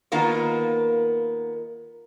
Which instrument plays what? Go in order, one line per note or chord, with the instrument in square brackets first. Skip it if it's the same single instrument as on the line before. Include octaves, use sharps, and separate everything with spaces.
[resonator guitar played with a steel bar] D#3 A#3 B3 F4 A#4